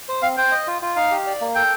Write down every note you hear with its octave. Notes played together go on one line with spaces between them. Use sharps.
C5
C4 F5
C5 G5
D#5
F4
F4
D#4 F5
G4
D5
A#3
A4 G5